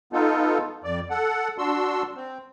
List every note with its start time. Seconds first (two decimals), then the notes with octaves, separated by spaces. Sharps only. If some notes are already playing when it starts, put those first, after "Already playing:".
0.13 B3 D#4 F4 A4
0.84 F2 D5
1.10 A4 F#5
1.58 D4 F#4 C6 E6
2.16 C4